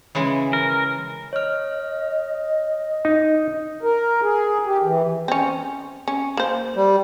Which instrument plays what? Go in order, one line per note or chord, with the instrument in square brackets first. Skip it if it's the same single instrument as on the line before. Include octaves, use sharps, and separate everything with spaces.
[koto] C#3 E3 G#3
[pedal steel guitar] A#4
[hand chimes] C#5 F6 [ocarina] D#5
[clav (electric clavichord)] D#4
[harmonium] A#4
G#4
G4
E3
[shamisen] C4 C#4
C#4
A#3 C5
[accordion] G3